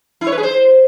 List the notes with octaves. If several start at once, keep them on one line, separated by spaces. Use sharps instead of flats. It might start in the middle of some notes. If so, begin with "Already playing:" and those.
E4
C#5
B4
G#4
C5